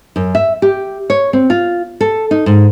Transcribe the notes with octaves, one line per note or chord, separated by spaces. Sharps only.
F#2
E5
G4
C#5
C4
F4
A4
D#4
G#2